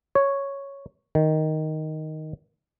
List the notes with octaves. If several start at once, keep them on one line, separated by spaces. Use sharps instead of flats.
C#5
D#3